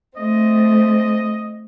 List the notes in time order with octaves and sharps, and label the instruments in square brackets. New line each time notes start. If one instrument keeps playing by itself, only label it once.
[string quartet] A3 C4 [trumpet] D#5